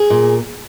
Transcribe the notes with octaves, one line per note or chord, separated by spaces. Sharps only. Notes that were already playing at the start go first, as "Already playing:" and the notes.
Already playing: G#4
A#2